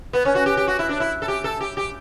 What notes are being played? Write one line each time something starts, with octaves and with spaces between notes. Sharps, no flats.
B3
C#4
F#4
G4
G4
F#4
E4
D4
E4
A4
G4
A4
G4
G4